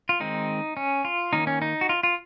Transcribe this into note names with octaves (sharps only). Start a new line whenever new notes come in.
F4
D#3 G#3 C4 D#4
C#4
F4
D#3 A#3 C#4 D#4
C#4
D#4
F#4
F4
F4